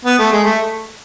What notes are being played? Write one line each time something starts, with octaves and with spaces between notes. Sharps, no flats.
B3
A3
G#3
A3